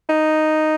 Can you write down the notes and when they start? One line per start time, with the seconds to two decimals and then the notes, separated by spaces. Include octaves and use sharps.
0.09 D#4